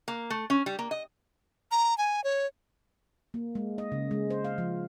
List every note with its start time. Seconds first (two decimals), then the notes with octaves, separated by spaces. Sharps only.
0.08 A#3
0.30 A3
0.50 C#4
0.66 G3
0.79 A#3
0.91 D#5
1.71 A#5
1.98 G#5
2.24 C#5
3.34 A#3
3.55 G#3
3.78 D#5
3.92 C#3
4.11 G#3
4.30 C5
4.44 F5
4.58 F3